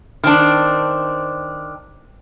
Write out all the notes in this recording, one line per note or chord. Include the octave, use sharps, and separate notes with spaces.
D#3 C4 D4